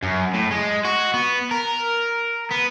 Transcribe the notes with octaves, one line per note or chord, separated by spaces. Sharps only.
F#2
A2
G#3
F#4
B3
A#4
B3